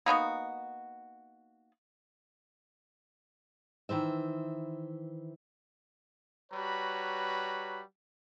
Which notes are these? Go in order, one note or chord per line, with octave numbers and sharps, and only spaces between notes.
A#3 B3 D#4 F#4
D#3 E3 C5 E5
G3 F#4 B4 C#5 A#5 B5